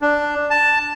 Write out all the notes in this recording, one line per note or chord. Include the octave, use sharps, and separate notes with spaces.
D4
A5